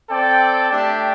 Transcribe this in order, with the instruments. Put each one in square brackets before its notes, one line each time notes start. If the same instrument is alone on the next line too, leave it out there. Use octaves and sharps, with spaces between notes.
[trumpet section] C4 A4 D5 G5
A3 D4 G4 D5 G5